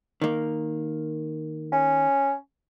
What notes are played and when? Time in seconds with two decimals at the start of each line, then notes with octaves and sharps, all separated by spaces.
0.22 D#3 A#3
1.72 C#4